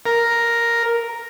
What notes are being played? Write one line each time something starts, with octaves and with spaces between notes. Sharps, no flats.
A#4